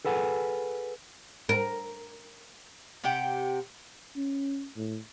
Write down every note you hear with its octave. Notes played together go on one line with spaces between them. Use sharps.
G#4 A4 B4 F#5 G#5
A#4
C3 G4 F#5 G5
C#4
A2